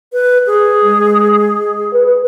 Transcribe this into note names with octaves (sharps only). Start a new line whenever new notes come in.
B4
G#4
G#3
B4